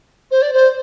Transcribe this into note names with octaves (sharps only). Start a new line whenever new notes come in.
C5
D5
C5